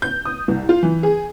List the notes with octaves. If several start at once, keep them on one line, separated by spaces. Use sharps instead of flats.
G6
D#6
C2
F4
E3
G#4